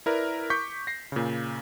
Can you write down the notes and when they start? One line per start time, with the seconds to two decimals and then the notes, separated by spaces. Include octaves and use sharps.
0.06 E4 A#4 B4 D5
0.50 C#6 D6 G6 B6
0.87 A#6 C7
1.12 A#2 C#3